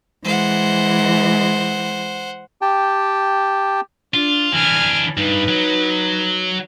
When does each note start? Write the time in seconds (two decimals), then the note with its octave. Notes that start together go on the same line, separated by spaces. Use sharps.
0.24 E3 G#3 C5 F#5
2.61 G4 G5 A5
4.14 D4 F4
4.53 E3 D4 G#5 F6
5.17 G2 D#4 B4
5.49 F#3